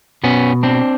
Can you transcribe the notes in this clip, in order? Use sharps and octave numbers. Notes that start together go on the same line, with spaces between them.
B2 B3 C#4
C4 D4